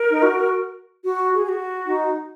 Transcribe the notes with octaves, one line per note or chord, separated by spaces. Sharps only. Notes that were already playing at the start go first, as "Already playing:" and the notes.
Already playing: A#4
D#4
F#4
F#4
G#4
G#4
F#4
D#4